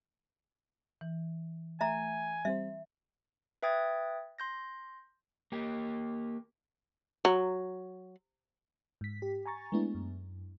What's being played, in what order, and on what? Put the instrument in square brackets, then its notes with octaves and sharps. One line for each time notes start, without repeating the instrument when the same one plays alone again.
[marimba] E3
[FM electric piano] A3 [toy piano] E5 A#5 [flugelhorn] G#5
[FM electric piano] G3 C4 C5 [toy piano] E5
[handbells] B4 E5 G5 D#6 G#6 A6
C6 G6 A#6
[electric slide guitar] A#3 G4
[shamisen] F#3
[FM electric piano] G#2 B6
G4
G#5 A#5 C#6 A6
G#3 A3 B3 D4 E4
F#2